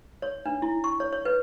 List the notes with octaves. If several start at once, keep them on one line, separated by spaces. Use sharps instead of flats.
C#5
D4
E4
C#6
C#5
C#5
B4